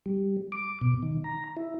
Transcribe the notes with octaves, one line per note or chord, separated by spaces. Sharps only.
G3
D6
B2
D#3
A#5
E4